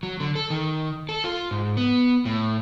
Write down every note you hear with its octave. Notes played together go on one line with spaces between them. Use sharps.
F#3
D3
A4
D#3
A4
F4
G#2
B3
A2